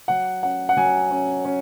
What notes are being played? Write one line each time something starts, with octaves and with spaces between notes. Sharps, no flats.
F#3 F#5
C#4 F#5
F#5
F#3 G#5
C#4
C#4